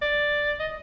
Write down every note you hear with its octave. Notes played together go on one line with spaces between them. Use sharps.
D5
D#5